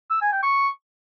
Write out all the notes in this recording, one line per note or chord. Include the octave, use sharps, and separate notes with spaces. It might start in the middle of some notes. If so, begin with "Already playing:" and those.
E6
G#5
G5
C#6